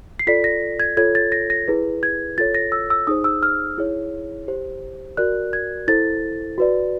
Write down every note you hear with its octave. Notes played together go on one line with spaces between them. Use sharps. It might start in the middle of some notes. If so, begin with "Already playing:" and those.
C7
F4 A4 D5 B6
A#6
G#6
F4 A4 C#5 G#6
A6
A#6
A#6
E4 G#4 B4
G#6
F4 A4 C#5 A6
A#6
E6
E6
D#4 G#4 C5 D#6
E6
F6
E4 G#4 C#5
G4 C5
F#4 A#4 D5 F#6
G#6
E4 A4 C5 A6
F#4 B4 D5